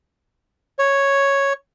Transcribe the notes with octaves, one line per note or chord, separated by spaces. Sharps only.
C#5